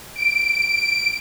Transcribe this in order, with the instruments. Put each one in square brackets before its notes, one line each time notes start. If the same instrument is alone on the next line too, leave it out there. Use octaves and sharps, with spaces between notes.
[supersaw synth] D7